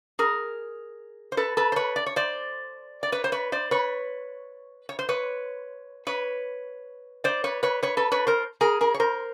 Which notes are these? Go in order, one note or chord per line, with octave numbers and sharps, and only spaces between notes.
G#4 A#4
C5
A4 B4
A4 B4
C5
B4 C#5
D5
C#5
C5 D5
D5
B4 C#5
C5
B4 C#5
C5 D5
B4 C#5
C#5
C5
B4 C#5
B4 C#5
C5 D5
B4 C#5
B4 C#5
B4 C#5
A4 B4
B4 C#5
A#4 C5
G#4 A#4
G#4 A#4
C#5
A#4 C5